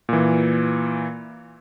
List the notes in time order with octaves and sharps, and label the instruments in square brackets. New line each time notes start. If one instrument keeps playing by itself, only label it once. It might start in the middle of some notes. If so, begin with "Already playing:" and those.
[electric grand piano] A#2 E3